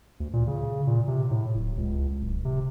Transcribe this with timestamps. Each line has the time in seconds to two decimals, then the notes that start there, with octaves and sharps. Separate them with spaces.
0.20 D2
0.33 A#2
0.47 C#3
0.87 A#2
1.08 C3
1.31 A2
1.55 D1
1.78 C#2
2.21 D1
2.45 C3